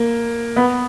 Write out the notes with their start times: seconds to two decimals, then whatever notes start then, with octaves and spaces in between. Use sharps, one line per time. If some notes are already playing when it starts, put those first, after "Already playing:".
Already playing: A#3
0.56 B3